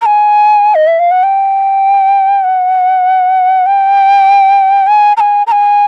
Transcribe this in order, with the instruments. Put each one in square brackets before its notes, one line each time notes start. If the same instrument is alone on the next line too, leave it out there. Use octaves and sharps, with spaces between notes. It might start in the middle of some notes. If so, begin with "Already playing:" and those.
[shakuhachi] A#5
G#5
D#5
E5
F5
F#5
G5
F#5
G5
G#5
A#5
G#5
A#5
G#5